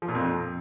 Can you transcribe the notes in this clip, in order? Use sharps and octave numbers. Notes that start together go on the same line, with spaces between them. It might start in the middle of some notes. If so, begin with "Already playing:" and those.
F3
A#2
F2